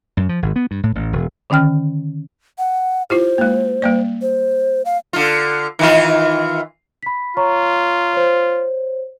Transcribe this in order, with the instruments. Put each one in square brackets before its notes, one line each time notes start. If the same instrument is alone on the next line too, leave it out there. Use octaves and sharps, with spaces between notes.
[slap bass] F#2
F3
G#1
B3
G2
A2
A1
E1
[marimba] D3 D#3 C#4 G5 F6
[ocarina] F#5
[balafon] E4 F4 G4 [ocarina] C5
[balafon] G#3 A#3
G3 A#3 D5
[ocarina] C5
F5
[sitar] D3 F4
D#3 E3 F4
[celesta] B5 B6
[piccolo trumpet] F4 [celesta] C#5 A#5 C#6
[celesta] C5 C#5